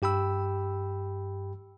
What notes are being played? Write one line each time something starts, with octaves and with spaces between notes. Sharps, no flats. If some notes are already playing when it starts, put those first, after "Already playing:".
G2 G4 G5 B5 E6